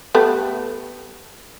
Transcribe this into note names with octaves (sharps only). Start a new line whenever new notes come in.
G3 A3 B3